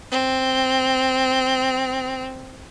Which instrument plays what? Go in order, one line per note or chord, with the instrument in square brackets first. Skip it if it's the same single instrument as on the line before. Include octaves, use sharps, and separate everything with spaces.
[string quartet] C4